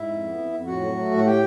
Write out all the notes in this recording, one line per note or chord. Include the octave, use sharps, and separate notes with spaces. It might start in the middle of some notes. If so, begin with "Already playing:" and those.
Already playing: G#2 E4 E5
F2
B3
F2
F2
A2 F#4 F#5
F#3
A3
A2
F#5
G4 G5